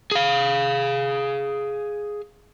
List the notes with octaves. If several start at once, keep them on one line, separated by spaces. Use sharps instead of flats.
G#4 F5